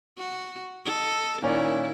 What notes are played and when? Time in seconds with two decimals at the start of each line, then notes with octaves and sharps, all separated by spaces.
0.17 F#4
0.85 A4 D#5
1.42 A#2 D#3 C#4 E4 D5